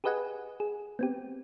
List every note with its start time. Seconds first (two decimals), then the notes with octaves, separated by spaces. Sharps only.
0.04 G4 G#4 B4 D#5 F#5 G#5
0.60 G#4
0.99 B3 C4 G4